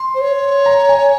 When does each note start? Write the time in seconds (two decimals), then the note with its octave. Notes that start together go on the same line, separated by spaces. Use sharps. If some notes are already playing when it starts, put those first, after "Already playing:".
Already playing: C6
0.15 C5
0.21 C#5
0.66 A#5
0.89 G#5